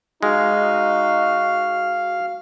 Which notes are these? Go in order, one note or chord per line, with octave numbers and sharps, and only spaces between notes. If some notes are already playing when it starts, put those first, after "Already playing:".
G#3 D#4 F#4 F5